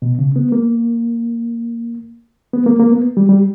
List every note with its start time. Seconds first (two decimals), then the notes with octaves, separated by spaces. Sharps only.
0.02 B2
0.19 C#3
0.36 B3
0.52 A#3
2.54 B3
2.66 A#3
2.80 A#3
2.92 B3
3.17 G3
3.29 G3